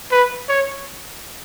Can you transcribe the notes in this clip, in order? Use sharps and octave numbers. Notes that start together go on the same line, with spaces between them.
B4
C#5